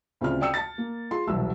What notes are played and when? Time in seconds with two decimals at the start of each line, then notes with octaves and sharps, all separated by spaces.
0.21 D2 C#3 C4 D4 F4 F6
0.41 D5 G5 D#6 E6 C#7
0.54 A5 A6
0.78 A#3
1.11 F4 G#4 C6
1.27 E1 C2 F#3 F#4 E6